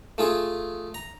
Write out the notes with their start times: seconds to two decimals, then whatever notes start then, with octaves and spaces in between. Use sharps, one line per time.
0.18 A3 F4 G#4
0.94 A#5